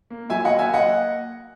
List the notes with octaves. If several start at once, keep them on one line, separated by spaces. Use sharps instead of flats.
A#3
F#3 E5 G#5
D#5 F#5
A#3
E5 G#5
A#3 D#5 F#5